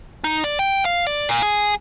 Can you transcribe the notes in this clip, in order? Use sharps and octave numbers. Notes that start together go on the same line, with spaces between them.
D#4
D5
G5
F5
D5
A#2
G#4